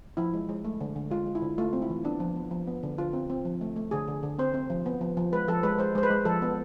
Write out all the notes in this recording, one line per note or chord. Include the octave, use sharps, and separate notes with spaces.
F3 E4
G#3
G#3
A3
D3
D3
G#3 F4
G#3
E4
D3
A3 F4
C4
E4
E3
B3 D4
F3
B3
F3
B3
D3
D3 F4
C4
C4
F3
A3
A3
D3 G#4
D3
D3
C4 C5
C4
F3
B3
F3
F3
G#3 B4
F3 A4
G#3 B4
G#3 C5
G#3 C5
B4
G#3
F3 A4
B3